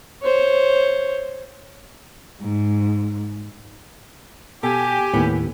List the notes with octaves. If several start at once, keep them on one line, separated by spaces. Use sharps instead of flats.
C5 C#5
G#2
B2 G4 A4 G#5
D#2 A2 B3